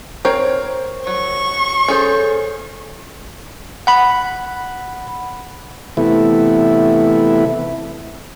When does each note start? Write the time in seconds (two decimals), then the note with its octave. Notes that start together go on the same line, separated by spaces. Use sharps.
0.25 C4 A#4 C5 C#5
1.07 F#3 C#6
1.88 C#4 G#4 A4 C5
3.87 F#5 B5
5.97 C3 E3 A3 B3 E4